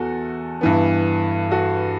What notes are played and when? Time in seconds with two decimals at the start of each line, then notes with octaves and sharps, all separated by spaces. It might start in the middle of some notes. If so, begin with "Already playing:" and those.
Already playing: E2 F#4 A4
0.61 G2 E3 B3
1.51 F#4 A4